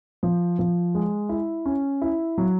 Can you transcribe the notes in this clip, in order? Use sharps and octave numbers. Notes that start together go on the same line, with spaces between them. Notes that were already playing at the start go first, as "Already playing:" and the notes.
F3
F3
G#3
E4
C#4
E4
F#3